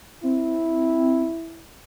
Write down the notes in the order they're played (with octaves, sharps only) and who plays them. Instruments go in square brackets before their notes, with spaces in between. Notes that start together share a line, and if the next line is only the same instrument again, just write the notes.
[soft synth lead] C4 [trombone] E4